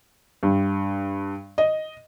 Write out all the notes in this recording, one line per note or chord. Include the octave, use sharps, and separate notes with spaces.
G2
D#5